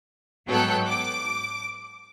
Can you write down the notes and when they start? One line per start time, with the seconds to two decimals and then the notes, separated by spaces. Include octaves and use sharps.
0.47 G#2 F#3 B3 A4 G5 F#6
0.88 D6